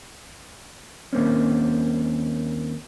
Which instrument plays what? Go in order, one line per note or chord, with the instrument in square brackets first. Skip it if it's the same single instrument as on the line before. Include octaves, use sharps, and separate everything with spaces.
[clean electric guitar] D#2 A#3 C4 C#4